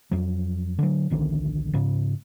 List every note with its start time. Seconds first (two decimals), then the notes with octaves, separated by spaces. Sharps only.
0.11 F2 F#3
0.79 D3 F#3
1.10 D1 A#1 D3 D#3
1.73 G#2 C#3